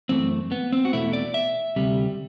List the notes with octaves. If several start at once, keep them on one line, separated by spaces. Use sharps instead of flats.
F#2 E3 A3 C4
B3
C4
F#4
E2 B2 A3 E4
D5
E5
D2 C3 G3